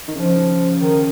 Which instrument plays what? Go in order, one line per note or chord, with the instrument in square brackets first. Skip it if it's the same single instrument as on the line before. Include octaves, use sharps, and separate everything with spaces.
[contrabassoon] D#3
[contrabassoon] C#3 [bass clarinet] F3
[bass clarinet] D#3